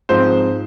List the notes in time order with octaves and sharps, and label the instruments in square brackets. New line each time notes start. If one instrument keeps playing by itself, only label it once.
[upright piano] G#2 F3 C4 C5